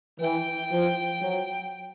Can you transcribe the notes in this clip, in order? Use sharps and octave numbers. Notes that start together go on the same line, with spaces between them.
E3 G5
F3
F#3